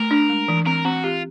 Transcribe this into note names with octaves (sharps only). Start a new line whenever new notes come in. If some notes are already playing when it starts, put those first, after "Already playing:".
Already playing: A3 A#4
D4
G#3
E3
C4 A#4
C4 F#4
F4 G4